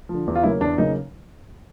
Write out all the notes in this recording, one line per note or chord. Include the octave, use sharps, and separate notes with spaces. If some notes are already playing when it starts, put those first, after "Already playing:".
D3 F3
E2
F4
C#3 F#3 A#3 C#4 E4
E2 D4
C#3 F#3 A#3 C#4 D#4